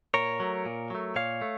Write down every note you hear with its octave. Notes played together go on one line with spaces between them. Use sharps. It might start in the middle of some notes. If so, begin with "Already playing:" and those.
A#2 A#4 C#5
F#3 A3
A#2
F#3 A3
A#2 C#5 F5
A3